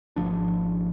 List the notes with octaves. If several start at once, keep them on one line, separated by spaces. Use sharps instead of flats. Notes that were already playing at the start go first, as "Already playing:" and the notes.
G#1 E2 F3 D4